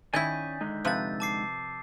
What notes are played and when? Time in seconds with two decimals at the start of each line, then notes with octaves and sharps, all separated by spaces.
0.14 D#3 C#4 E4 D5 G#5 D#6 G6 B6
0.61 D3 G#3 D#4
0.85 C3 F3 B4 E6 A6
1.20 A5 D6 C7